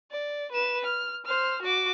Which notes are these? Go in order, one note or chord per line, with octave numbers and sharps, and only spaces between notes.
D5
B4 E7
F6
C5 F6
F#4 D6